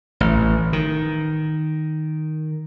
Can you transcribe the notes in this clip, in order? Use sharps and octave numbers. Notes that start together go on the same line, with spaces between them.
A1
D#3